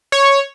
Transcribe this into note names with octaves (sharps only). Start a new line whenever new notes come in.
C#5